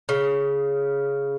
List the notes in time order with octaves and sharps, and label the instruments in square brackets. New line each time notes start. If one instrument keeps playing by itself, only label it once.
[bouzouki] C#3